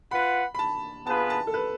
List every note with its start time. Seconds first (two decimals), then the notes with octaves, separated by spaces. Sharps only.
0.11 F4 B4 F#5 B5
0.55 B5
0.59 A5
1.06 B3 F4 G#4 B4 A5
1.30 A5
1.47 A4
1.54 B4